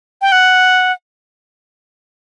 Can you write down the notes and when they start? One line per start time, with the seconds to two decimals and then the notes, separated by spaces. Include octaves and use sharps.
0.22 G5
0.32 F#5